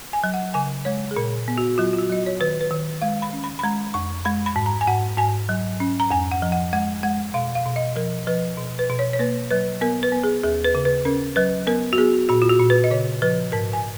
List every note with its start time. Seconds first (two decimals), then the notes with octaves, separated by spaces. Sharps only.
0.13 G#5
0.24 F#3
0.34 F#5
0.54 C#3 G#5
0.85 G#3 C#5
1.11 G#4
1.16 A#2 A#4
1.48 B3
1.58 F#4
1.78 F#3 F4
1.93 F4
1.98 F#4
2.10 F#3 D#5
2.26 C#5
2.40 D#3 B4
2.61 B4
2.71 D#3
3.02 G#3 F5
3.22 B5
3.33 C#4
3.44 B5
3.59 B5
3.64 G#3 A#5
3.94 F2 C#6
4.25 G#3 B5
4.46 B5
4.56 G#2
4.66 A#5
4.81 G#5
4.87 G#2 F#5
5.18 G#2 G#5
5.49 F#3
5.80 C#4
6.00 A#5
6.11 F2 G#5
6.32 F#5
6.42 F3
6.52 F#5
6.73 G#3 F#5
7.03 G#3 F#5
7.34 B2 F5
7.55 F5
7.66 B2
7.76 D#5
7.96 F3 A#4
8.27 F3 B4
8.57 B2
8.79 B4
8.90 B2
8.99 C#5
9.13 C#5
9.19 A#3 B4
9.51 F#3 B4
9.81 B3 A#4
10.03 B4
10.12 B3
10.24 G#4
10.44 D#2 G#4
10.65 B4
10.75 C#3
10.85 B4
11.05 C#4 A#4
11.36 F#3 B4
11.67 B3 A#4
11.93 F#4
11.98 B3 G#4
12.29 A#2 F#4
12.42 F4
12.49 F#4
12.60 A#2
12.70 B4
12.84 D#5
12.91 C#3 C#5
13.22 F3 B4
13.52 G#2 A#4
13.73 G#5